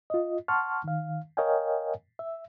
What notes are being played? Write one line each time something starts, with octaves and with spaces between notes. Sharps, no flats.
F4 D#5
F#5 A5 C6 C#6 F6
D#3 F5
A#4 C#5 D#5 F5 G5 G#5
E5